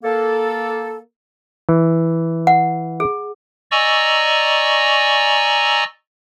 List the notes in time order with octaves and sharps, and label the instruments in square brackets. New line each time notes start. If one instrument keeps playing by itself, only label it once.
[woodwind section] A#3 A4
[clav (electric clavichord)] E3
[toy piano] F#5
G#4
[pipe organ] D5 D#5 G#5 A#5 C#6 E6